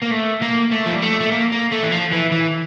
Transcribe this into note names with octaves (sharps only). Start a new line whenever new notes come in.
A#3
A3
A#3
A3
F3
G3
A3
A3
A#3
A#3
A3
E3
F3
E3
E3